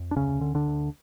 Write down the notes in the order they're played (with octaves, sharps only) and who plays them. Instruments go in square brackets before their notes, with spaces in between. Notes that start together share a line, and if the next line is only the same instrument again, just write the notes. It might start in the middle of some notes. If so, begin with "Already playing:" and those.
Already playing: [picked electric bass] F2
D4
D2 C#3 C#4
D3
D3 D4
D2